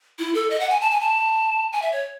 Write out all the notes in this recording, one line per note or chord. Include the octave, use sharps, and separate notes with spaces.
E4
A4
D#5
F#5
G#5
A5
G#5
A5
G#5
E5
C#5